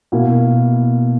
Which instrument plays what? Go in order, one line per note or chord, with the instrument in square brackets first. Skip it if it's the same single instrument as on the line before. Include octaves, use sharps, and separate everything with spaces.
[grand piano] B2 A#3 E4